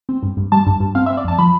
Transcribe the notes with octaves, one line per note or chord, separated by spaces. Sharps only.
C4
G2
G2
G3 A5
G2
G2
C4 F5
C4 E5
D5
F2 A5
F3 B5